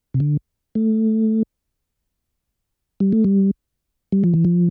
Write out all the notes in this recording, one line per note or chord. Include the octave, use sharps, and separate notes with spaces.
C3
D3
A3
G3
A3
G3
G3
F3
E3
F3